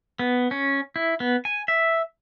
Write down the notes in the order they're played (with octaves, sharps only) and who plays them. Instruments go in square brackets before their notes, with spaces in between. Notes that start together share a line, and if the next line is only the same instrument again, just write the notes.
[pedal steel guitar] B3
C#4
E4
B3
G#5
E5